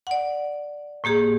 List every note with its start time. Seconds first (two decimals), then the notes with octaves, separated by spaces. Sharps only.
0.07 D5 F#5
1.04 A2 A#3 G4 G#4